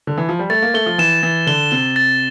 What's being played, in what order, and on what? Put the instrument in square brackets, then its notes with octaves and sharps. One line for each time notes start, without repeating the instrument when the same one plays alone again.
[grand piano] D3
E3
F3
G3
[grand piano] A3 [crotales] A6
[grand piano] A#3
[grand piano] A3 [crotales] G7
[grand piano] F3
[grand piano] E3 [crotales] E7
[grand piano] E3 [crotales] A6
[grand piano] D3 [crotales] G7
[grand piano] C3 [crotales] G7
[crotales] A6